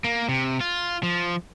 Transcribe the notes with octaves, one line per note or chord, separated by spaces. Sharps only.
A#3
C3
F4
F3